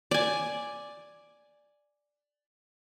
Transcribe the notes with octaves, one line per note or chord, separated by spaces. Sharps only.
D5 G#5